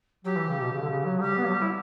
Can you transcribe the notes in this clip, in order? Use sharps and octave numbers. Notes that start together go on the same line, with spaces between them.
F#3 G4
E3
C#3
B2
C#3
D3
C#3
F#3
G3 G4
B3
F#3
G3
E4